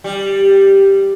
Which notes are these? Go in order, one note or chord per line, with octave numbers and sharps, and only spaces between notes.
G3